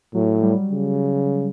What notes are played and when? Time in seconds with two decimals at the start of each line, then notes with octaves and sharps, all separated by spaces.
0.14 A2 F#3
0.34 F#3
0.42 G3
0.71 C#3